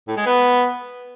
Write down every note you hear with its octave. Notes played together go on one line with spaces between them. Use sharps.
A2
G#3
B3